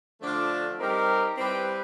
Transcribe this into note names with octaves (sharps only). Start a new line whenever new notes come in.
D3 F3 A3 D4 F4
G3 C4 D#4 G4 A#4
G3 C4 E4 G4 B4